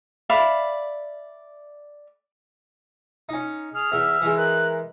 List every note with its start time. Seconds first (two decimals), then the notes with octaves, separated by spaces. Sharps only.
0.30 D5 E5 F5 B5
3.29 C#4 D#4
3.74 G#4 F6
3.92 E2 E5
4.21 E3 G#3
4.37 A#4 F#6